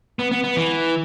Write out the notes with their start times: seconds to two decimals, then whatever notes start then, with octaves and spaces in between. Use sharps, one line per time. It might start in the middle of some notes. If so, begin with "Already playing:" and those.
0.19 B3
0.32 B3
0.44 B3
0.56 E3